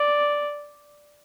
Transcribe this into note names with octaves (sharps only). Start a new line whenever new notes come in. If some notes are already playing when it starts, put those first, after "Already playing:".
Already playing: D5